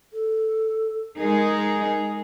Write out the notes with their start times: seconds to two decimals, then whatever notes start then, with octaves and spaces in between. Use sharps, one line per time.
0.13 A4
1.17 G#3 D#4 G#4 A#4